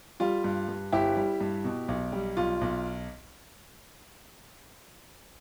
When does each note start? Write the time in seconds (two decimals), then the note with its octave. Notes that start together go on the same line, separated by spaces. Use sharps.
0.20 G3 F4
0.44 G2
0.68 G2
0.92 G1 E4 G4
1.17 G3
1.41 G2
1.64 B2
1.88 B1
2.12 G3
2.37 B1 F4
2.61 B1